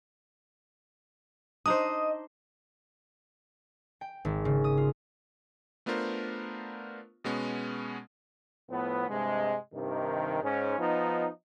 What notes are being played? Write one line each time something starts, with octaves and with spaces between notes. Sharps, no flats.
D4 D#4 C5 D#5 D#6
G5
G#1
C#3
D#6
F4
A3 B3 D4 F4 A#4 C5
B2 G#3 B3 C#4
A2 F3 B3
G2 C3 G#3
G2 C3 D#3
G#2 C#4
F3 B3 D#4